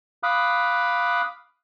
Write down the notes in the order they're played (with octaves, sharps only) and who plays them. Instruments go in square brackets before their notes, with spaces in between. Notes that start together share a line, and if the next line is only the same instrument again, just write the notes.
[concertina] F5 B5 D6 D#6 F#6